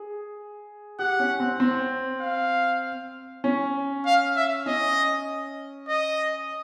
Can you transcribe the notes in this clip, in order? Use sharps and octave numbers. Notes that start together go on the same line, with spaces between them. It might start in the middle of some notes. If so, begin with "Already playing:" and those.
Already playing: G#4
G4 F#5
C#4
C4
C4
F5
C#4
F5
E5
C#4 D#5
D#5